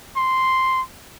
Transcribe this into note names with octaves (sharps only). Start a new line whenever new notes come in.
C6